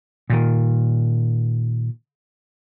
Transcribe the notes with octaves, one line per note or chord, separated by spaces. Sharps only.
A#2 D#3